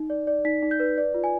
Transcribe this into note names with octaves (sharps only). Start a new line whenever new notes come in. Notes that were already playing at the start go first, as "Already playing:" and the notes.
Already playing: D#4
D5
D5
D#4 B6
D#4
G6
B4
D5
F4
G#5